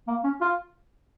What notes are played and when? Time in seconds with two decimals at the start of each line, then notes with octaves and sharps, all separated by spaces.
0.08 A#3
0.24 C#4
0.41 F4